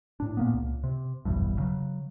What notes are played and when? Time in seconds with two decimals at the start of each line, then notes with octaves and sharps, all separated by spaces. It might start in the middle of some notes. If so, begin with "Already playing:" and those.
0.20 A2 D4
0.37 A#2 A#3 B3
0.54 C#2
0.84 C3
1.25 F#1 B1 E2 G2
1.59 C#3 F#3